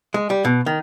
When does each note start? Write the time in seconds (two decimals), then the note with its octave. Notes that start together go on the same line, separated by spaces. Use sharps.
0.14 G#3
0.30 G3
0.45 B2
0.66 D#3